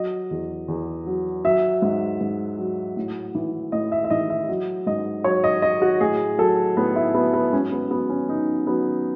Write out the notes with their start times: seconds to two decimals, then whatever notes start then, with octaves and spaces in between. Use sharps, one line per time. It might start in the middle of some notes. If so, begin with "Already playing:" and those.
Already playing: F#3 D#5
0.31 E2
0.68 E2
1.06 F#3
1.45 F#3 E5
1.82 G#2
2.21 G#2
2.58 F#3
2.97 A2
3.35 E3
3.72 A2 D#5
3.92 E5
4.05 E5
4.10 E3 D#5
4.30 E5
4.49 F#3
4.87 G#2 D#5
5.24 F#3 C#5
5.44 D#5
5.62 F#3 D#5
5.82 F#4
6.01 A2 G#4
6.38 F#3 A4
6.77 A2 B3
6.96 E4
7.14 F#3 B3
7.33 B3
7.53 G#2 C#4
7.72 B3
7.91 F#3 B3
8.10 C#4
8.29 F#3 D#4
8.66 F#3 B3